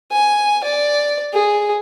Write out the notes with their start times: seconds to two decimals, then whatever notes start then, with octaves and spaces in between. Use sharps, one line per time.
0.11 G#5
0.64 D5
1.33 G#4